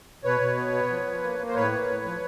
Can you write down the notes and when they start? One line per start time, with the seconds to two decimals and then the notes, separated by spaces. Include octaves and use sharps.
0.24 B2 B4 C#5
0.41 B2
0.57 B3
0.73 B3
0.90 F3
1.07 F3
1.23 A#3
1.39 A#3
1.48 C5
1.55 A2 B4 C#5
1.72 A#3
1.88 A2
2.05 F3